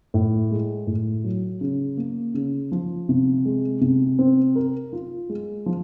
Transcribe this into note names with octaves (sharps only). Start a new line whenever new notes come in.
A2
G#3
A2
F#3
C#3
A#3
C#3
F3
C3
G#3
C3
C4
A#4
F4
G#3
F3